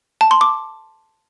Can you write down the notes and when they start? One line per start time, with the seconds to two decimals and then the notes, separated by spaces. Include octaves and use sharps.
0.21 A5
0.31 C6
0.41 D6